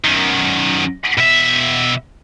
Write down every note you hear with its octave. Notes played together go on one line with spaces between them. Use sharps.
F#2 D#3
B2 E5